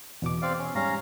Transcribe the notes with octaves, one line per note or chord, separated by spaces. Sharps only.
E2 B2 D6
C4 D5 F5
C#4
G#2 G3 C#4 F5 A#5